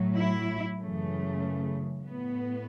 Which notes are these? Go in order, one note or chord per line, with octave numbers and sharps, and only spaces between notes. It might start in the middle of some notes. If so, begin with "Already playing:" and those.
Already playing: A2 F#3
E4
F#2 C#3 E3 A3
A2 B3